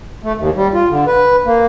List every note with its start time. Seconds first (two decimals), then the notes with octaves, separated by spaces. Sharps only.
0.24 A3
0.38 D#2
0.55 G3
0.74 F4
0.90 D3
1.07 B4
1.46 A#3